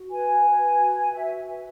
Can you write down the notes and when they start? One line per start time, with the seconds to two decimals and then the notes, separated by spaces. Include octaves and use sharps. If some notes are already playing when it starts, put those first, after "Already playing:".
Already playing: F#4
0.11 B4 G#5
0.45 B4
0.79 F#4
1.13 F#4 E5
1.47 B4